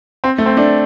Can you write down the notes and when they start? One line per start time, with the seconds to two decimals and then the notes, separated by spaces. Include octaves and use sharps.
0.24 C4
0.38 A3
0.46 C4
0.57 A3 D4